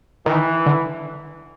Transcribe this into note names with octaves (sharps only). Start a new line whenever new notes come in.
D#3 E3
D3